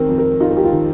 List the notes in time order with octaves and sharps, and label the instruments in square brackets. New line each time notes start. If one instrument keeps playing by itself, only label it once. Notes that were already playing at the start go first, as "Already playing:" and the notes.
Already playing: [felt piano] D#3 C4 [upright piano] A#4
[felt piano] F2
[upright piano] A#4
[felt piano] D#4 [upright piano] F4
[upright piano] A#4
G4
F4
[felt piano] D#3